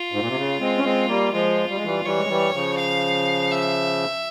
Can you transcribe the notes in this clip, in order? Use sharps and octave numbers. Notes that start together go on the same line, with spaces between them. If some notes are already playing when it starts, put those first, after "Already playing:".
Already playing: F4
G#2
A#2
C3
C#3
G#3 C4
C#4
G#3 C4
G3 A#3
F3 G#3 F4
G3
G#3
E3 G3
E3 G3 C#5
G#3
E3 G3
C#3 F3
F5
E5